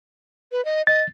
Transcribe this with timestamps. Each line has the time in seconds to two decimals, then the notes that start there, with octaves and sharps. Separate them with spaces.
0.52 B4
0.65 D#5
0.87 D#5 A6